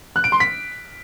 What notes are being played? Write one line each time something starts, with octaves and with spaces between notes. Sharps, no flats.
F#6
D7
C6
B6